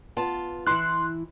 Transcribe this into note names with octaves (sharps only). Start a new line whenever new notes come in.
B3 F4 A5
E3 E4 C6 F#6